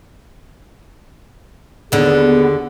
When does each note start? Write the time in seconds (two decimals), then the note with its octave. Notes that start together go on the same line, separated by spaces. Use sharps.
1.92 D#2 D3 B3 G#4